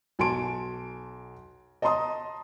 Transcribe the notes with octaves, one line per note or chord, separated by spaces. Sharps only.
B1 G#5 A5 C6 D7
D#5 A5 A#5 C6 D#6